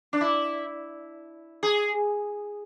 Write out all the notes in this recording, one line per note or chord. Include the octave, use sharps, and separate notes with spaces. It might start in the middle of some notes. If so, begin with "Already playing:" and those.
D4
E4
G#4